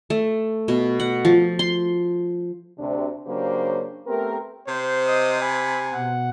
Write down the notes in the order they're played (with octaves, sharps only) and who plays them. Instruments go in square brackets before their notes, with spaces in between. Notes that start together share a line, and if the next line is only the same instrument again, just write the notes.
[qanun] A3
B2
F#5
F3
C6
[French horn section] D2 C3 D4
C#3 F#3 A#3 D4 G4 C5
A3 B3 C4 G4 A#4
[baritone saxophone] C3 [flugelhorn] C5
[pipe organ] D#5 D#6
[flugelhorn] G#5 [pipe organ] B5
[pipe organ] B2 F#5